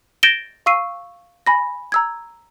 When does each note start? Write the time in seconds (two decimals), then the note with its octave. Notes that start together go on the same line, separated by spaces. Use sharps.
0.23 G6 A6 A#6 D7 E7 G7
0.66 F5 C#6 E6 C7 D#7
1.47 G#5 B5 A#6
1.92 A#5 E6 G#6